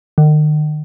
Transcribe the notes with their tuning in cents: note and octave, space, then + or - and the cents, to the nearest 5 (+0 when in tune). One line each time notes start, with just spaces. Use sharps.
D#3 -40